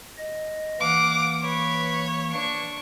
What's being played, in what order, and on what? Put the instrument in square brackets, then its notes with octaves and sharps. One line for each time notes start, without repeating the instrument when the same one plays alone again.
[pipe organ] D#5
[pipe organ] E3 A#3 [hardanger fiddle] F5 F#5 [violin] D6
[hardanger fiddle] B4 B5 [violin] C#5
[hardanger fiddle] D4 C#6